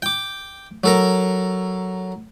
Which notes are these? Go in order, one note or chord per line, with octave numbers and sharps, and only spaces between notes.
G5 D6
F#3 A4 A#4